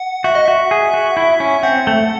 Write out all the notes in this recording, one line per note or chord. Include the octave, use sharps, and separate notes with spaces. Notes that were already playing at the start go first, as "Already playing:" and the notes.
Already playing: F#5
F#4 E5
D#5
F#4 E5
G#4
F#4
E4
C#4
C4 F#5
A3